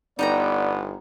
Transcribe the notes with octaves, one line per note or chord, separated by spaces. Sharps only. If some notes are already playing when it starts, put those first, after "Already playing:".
G1 B3 D#4 D5 G5 A#5